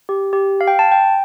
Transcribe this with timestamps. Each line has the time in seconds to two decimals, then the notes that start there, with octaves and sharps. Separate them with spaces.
0.09 G4
0.33 G4
0.61 F5
0.68 G5
0.79 A5
0.92 G5